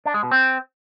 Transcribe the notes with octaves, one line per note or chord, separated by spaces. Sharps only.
D4
G#3
B2
C4